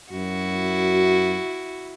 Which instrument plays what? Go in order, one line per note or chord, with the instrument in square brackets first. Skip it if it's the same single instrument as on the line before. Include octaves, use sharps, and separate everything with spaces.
[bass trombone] F#2 [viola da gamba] E4 F#4